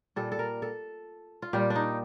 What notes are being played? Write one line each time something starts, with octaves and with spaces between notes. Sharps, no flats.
A#2 G3 A4
A4
A#4
A4
F4
A#2 G3 G4
D4
D#4